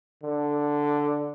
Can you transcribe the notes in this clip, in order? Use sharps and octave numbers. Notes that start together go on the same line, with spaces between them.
D3